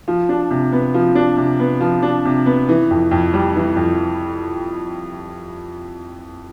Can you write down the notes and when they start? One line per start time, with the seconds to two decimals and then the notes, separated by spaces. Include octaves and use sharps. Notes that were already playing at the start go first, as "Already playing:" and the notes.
0.08 F3
0.29 D4
0.50 C3
0.72 B3
0.94 F3
1.15 D4
1.37 C3
1.60 B3
1.81 F3
2.02 D4
2.25 C3
2.46 B3
2.69 E3
2.91 F2
3.11 F2
3.34 G3
3.55 E3
3.76 F2